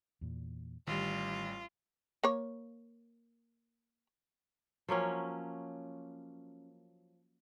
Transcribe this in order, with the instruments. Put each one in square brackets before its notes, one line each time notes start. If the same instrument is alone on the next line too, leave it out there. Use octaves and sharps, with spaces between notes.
[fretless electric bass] E2 A#2
[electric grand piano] A1 G3 [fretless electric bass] D#3 [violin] F4
[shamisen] A#3 C#5
[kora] F3 F#3 A#3 C#4